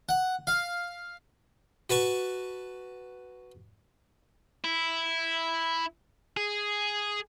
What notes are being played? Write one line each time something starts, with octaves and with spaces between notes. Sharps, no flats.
F#5
F5
F#4 B4 A5 C#6
E4
G#4